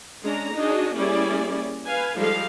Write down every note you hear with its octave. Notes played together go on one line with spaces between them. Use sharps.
G#3 C#4 D4 A#5
D4 D#4 F#4 G#4 D#5
G3 A#3 C#4 E4 G#4 D5
B4 F5 G#5
F3 G3 G#3 D#4 A4 F5